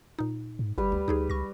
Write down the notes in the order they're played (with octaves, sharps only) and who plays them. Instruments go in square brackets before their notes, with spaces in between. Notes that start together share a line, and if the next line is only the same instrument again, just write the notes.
[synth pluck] A#2 D#4
[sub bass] G#2
[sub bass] G1 [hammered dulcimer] G3 B4
[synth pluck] D2
[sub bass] D2 [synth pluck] D#4 G4 G#4
[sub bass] C#2 [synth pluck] C#6 A#6